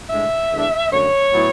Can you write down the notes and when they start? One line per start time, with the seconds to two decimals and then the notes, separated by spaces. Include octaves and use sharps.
0.09 A2 G#3 D4 E5
0.50 E2 D3 G#3 D4
0.91 F#2 D3 A3 C#5
1.33 A2 F#3 B3 E4